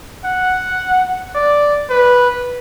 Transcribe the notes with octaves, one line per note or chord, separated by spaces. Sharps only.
F#5
D5
B4